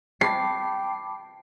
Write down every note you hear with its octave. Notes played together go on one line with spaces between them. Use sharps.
G5 A5 B5 D6 C7